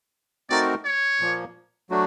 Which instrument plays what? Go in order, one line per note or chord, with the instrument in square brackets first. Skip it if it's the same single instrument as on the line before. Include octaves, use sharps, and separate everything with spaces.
[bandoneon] A3 C4 D#4 F#4 A#4 [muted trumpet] D5
[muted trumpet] C#5
[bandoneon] A#2 F3 A#3
F#3 A3 D4 F#4